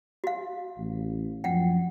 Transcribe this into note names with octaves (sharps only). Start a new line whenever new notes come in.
F#4 F5
A1
F#2 F3 C#4 F#5 G5